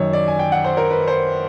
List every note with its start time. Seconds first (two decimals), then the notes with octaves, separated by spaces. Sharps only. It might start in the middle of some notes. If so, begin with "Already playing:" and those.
Already playing: F#2 D#3 C#5
0.13 D5
0.28 G#5
0.39 G5
0.52 F#5
0.64 C5
0.77 A#4
0.91 B4
1.08 C5